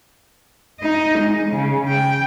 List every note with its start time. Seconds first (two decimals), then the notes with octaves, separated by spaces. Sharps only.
0.80 D#4 D#5
1.19 G#3
1.49 C#3
1.88 G5